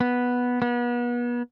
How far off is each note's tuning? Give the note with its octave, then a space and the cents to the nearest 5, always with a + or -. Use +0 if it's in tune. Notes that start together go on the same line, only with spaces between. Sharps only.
B3 -5
B3 -35